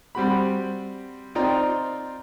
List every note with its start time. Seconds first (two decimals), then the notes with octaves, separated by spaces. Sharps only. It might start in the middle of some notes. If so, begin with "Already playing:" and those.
0.15 G3 C4 F#4 B5
1.35 C4 D#4 F4 D5 G5 A#5